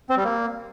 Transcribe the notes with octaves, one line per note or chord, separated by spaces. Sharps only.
C4
G3
A#3